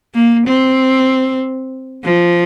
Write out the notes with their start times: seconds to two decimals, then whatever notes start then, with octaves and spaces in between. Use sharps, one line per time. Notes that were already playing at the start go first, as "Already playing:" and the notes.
0.15 A#3
0.47 C4
2.04 F3